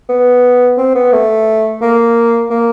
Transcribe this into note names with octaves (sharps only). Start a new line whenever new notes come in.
B3
C4
B3
A3
A#3
A#3